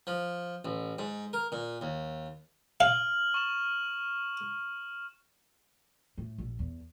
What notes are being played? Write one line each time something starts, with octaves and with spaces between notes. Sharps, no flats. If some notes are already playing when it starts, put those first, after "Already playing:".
F3
A1
G#2
A#4
A#2
D#2
F5 F6 F#7
C#6 E7
A2
A#1
E2